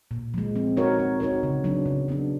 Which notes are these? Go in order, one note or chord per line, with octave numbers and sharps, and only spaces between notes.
A#2
F3 G#3
C4
D#4 F#4 A#4 C#5
C4
D#4 F#4 A#4 C#5
C#3
F#3 B3 D4
C#3
F#3 B3 D4